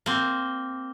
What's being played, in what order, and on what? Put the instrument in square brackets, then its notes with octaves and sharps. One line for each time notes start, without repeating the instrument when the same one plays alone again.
[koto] A#3 C4